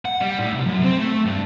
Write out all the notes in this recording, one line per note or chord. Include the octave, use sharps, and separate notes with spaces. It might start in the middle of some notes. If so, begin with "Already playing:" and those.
F#5
G3
A2
C2
F#2
C4
A3
G2